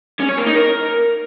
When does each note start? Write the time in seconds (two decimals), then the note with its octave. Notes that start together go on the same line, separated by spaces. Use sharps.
0.20 C#4
0.29 C#5
0.37 A#3
0.46 D#4
0.55 A#4